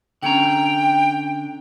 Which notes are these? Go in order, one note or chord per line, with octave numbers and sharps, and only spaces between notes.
D3 C#4 G5 A#5